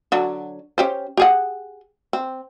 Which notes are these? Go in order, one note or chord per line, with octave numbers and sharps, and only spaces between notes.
D3 F#3
C#4 G4 C5
G4 G#4 F#5
C4